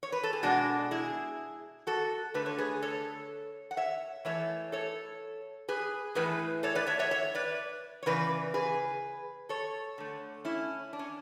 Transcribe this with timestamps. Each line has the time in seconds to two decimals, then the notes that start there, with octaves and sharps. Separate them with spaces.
0.03 C#5
0.12 B4
0.23 A4
0.33 G#4
0.43 B2 G#3 D4 F#4
0.91 E4 G#4
1.87 F#4 A4
2.34 D3 A3 B4
2.46 C#5
2.58 G#4 B4
2.82 A4 C#5
3.71 F#5
3.77 C#5 E5
4.25 A2 E3 A3 C#5 E5
4.72 A4 C#5
5.69 G#4 B4
6.15 A2 E3 A3 G#4 B4
6.63 A4 C#5
6.75 B4 D5
6.87 C#5 E5
6.99 C#5 E5
7.11 C#5 E5
7.35 B4 D5
8.03 C#5
8.06 C#3 E3 B4 D5
8.54 G#4 B4
9.49 A4 C#5
9.98 D3 A3
10.45 C#4 E4
10.93 D4
10.99 C#4